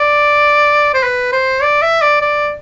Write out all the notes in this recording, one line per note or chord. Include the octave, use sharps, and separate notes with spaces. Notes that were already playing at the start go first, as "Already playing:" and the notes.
Already playing: D5
C5
B4
C5
D5
E5
D5
D5